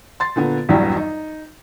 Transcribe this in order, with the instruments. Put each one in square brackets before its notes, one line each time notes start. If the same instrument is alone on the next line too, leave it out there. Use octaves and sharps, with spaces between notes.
[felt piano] C6 A6
A#2 D3 B3
A#1 E2 G2 E3 F#3 G3
D#4